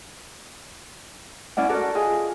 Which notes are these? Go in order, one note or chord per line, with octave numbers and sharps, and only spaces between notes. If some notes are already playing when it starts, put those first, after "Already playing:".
C#4 E4 D5 F#5
F#4 A4 A#4 D5
F4 G#4 D#5 G#5